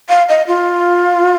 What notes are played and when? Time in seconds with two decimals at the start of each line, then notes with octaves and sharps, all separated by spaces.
0.09 F5
0.29 D#5
0.47 F4